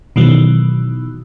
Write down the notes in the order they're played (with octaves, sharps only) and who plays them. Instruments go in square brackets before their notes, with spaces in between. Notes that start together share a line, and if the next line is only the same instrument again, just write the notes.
[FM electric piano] B2 D#3 E3 F#3